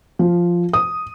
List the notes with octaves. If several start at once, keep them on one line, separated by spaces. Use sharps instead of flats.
F3
D#6